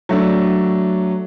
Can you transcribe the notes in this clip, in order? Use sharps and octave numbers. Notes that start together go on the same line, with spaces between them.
F#3 A3 D4